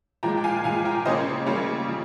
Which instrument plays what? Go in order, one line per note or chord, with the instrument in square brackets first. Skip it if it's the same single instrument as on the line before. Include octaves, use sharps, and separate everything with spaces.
[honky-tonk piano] A#2 F3 G#3 G5 A#5
G5
F5 G#5
A#2 F3 G#3 F5 G#5
G5 A#5
C#3 G3 A#3 C#4 C5 D#5
C#3 G3 A#3 C#4
C#3 F3